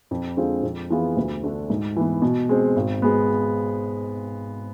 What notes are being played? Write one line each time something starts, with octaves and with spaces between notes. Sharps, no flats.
F2
D3 G#3 C4 F4
F2
E3 B3 F4 G#4
D2
D3 A3 D4
G#2
E3 B3
B2
G#3 C4
G#1
G#3 B3